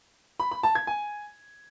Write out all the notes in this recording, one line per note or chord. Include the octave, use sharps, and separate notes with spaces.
B5
B5
A5
G#6
G#5